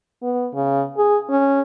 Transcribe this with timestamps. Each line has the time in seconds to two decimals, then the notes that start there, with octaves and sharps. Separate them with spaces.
0.22 B3
0.54 C#3
0.97 G#4
1.30 C#4